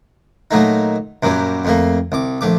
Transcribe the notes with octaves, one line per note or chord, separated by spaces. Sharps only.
A#2 F#3 A3 D#4
F#2 A#2 F#3 G3
F2 A3 A#3
C2 D6
A#1 A3 D6